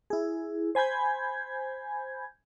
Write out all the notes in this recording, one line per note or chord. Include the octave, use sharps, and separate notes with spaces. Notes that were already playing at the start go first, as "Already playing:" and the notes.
E4 G#4
C5 G#5 B5 G6 G#6